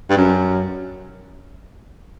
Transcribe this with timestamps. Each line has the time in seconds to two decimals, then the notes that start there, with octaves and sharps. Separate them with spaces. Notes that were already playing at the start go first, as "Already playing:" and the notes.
0.10 G2
0.17 F#2